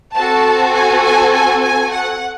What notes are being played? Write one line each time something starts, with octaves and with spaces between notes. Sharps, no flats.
C4 F#4 A4 A5
G#5
G#5
G#5
G#5
F#5